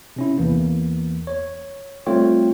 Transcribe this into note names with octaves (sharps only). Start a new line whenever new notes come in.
C3 C#4 E4
E2 E3 A#3
C#5
G3 A3 C4 F4 C#5 G5